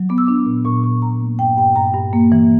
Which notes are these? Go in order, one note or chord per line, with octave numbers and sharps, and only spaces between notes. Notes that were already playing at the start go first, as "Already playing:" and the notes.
Already playing: F#3
B3 D6
E6
D4 D6
A#2
A#2 C#6
B3 C#6
A#2 A#5
A#3
G2 G5
G2 G5
G2 A#5
G2
A#3
E3